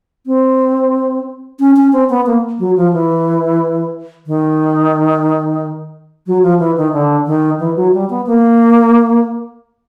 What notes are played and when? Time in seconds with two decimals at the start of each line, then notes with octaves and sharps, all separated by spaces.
0.26 C4
1.60 C#4
1.76 C#4
1.93 C4
2.10 B3
2.26 A#3
2.59 F#3
2.76 F3
2.93 E3
4.27 D#3
6.27 F#3
6.43 F3
6.60 E3
6.77 D#3
6.93 D3
7.27 D#3
7.60 E3
7.76 F#3
7.93 G3
8.10 B3
8.27 A#3